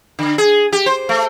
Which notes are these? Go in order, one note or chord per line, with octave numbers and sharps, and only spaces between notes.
D3
G#4
G4
C5
A3